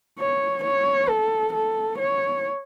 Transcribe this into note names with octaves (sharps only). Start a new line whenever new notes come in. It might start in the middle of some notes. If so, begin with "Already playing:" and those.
C#5
C#5
A4
A4
C#5